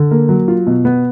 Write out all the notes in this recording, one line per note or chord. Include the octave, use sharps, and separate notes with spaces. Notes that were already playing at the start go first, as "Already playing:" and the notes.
Already playing: D3
A#3
F#3
F4
B2
B3